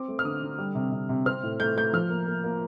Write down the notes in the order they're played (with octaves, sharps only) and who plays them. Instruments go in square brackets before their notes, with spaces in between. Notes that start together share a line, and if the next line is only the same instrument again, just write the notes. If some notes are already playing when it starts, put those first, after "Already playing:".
Already playing: [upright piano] C4 D6
A3
F6
D3 D#6
D3
G3
C3
C3
C3
C4 F6
A2
A3 G6
A3 G6
F3 F6
A#3
A#3
A#3